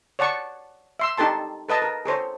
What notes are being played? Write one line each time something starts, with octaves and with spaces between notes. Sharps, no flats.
C#5 D5 F#5 A5 C#6
E5 C6 E6
D#4 G4 A4 A5 C6
A4 B4 D#5 A5
A#4
G#4 A4 C5 C#5